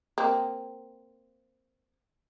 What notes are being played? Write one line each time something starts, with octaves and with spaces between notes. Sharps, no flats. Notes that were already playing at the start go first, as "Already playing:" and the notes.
A#3 C4